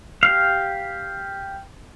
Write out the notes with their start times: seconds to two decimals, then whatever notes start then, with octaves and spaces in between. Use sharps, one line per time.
0.23 G4 F5